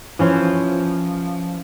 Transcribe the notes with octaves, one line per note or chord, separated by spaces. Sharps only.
E3 F3 C#4 C5